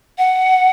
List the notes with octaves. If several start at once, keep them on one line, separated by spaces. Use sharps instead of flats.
F#5